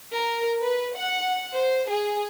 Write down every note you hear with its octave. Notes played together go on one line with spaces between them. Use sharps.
A#4
B4
F#5
C5
G#4